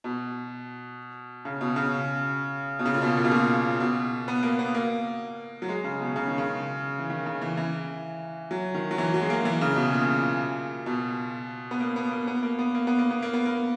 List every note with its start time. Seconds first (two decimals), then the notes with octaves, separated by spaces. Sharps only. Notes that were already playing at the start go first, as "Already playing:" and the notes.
0.04 B2
1.45 C#3
1.61 B2
1.76 C#3
2.79 B2
2.86 C#3
2.94 A#2
3.02 B2
3.17 A#2
3.25 B2
3.31 A#2
3.80 B2
4.28 B3
4.43 A#3
4.59 B3
4.74 A#3
5.62 F#3
5.69 G#3
5.84 C#3
6.01 B2
6.16 C#3
6.27 D#3
6.38 C#3
6.99 E3
7.10 D#3
7.26 C#3
7.42 E3
7.57 E3
8.51 F#3
8.74 D#3
8.91 F#3
8.98 E3
9.14 F#3
9.21 G#3
9.30 A#3
9.45 E3
9.61 C#3
9.76 B2
9.92 A#2
10.86 B2
11.71 B3
11.80 A#3
11.96 B3
12.11 A#3
12.27 B3
12.43 A#3
12.59 B3
12.75 A#3
12.87 B3
12.99 A#3
13.11 B3
13.22 A#3
13.33 B3
13.45 A#3